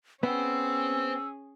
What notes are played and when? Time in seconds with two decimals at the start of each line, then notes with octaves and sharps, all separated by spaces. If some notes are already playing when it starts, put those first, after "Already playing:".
0.23 B3 C#4 G#4 C5 G5 E6